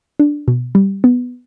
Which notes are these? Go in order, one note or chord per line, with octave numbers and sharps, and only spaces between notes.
D4
B2
G3
B3